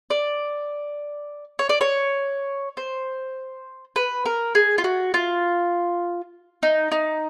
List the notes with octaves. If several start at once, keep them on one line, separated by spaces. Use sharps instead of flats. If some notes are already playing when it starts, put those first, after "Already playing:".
D5
C#5
D5
C#5
C5
B4
A#4
G#4
F4
F#4
F4
D#4
D#4